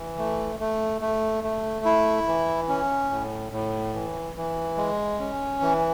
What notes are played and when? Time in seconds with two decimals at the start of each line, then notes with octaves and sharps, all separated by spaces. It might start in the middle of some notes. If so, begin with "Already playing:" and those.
Already playing: E3
0.18 A3
0.60 A3
1.01 A3
1.44 A3
1.85 E4
2.27 E3
2.69 C#4
3.10 A2
3.52 A2
3.94 E3
4.36 E3
4.77 G#3
5.19 C#4
5.61 E3